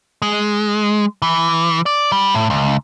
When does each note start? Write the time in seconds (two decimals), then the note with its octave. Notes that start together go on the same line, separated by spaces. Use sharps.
0.22 G#3
1.22 E3
1.86 D5
2.12 G3
2.35 A2
2.50 C#2